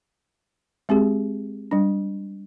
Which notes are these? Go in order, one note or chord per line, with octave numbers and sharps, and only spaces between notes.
G#3 C4 G4 G#4
G3 D4